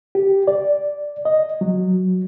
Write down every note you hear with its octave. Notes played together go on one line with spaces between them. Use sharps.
G4
D5
D#5
F#3